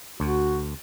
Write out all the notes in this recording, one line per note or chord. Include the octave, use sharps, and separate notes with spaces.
D2 F#4